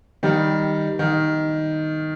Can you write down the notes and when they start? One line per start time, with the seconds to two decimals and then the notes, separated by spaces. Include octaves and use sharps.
0.23 D#3 G3
0.99 D#3